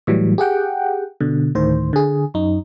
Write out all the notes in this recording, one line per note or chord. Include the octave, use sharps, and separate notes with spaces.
A2 E3 F#3 G3
G4 G#4 F#5 G5
B2 D3
D2 A2 D#3 C5
D3 G#4
F#2 D#4